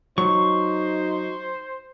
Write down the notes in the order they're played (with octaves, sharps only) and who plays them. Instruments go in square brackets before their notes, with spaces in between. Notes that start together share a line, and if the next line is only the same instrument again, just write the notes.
[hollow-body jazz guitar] F#3 [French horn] D#4 [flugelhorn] C5 [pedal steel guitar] C#6